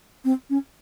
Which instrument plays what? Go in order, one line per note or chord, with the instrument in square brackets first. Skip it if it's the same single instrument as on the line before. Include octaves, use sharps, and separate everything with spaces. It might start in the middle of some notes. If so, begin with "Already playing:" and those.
[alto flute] C4
C#4